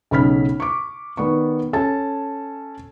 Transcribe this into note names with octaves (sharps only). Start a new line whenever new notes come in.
B1 C#3 C#4 B5 F6 B6
C#6 D6
D#3 B3 D5 C#6
C#4 A4 G#5 A5